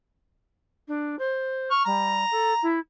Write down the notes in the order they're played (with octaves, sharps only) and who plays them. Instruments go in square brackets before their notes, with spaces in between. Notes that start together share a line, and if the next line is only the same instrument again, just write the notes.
[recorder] D4
C5
[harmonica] C#6 F6
[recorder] G3 [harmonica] A#5
[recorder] A4
E4